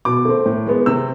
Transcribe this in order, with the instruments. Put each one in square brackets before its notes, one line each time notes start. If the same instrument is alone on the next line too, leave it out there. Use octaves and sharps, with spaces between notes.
[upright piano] B2 D6
A3 C4
A2
G#3 B3
C3 E6